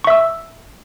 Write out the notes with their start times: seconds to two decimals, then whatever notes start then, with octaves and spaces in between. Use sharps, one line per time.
0.04 C#6
0.07 E5
0.10 E6